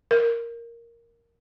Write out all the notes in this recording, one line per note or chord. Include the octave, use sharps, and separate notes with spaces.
A#4